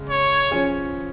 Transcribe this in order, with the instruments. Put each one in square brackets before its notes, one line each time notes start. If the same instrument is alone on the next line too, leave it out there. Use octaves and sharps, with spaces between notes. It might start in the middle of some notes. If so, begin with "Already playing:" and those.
Already playing: [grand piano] C#3 G#3
[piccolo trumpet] C#5
[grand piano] F3 C#4 G#4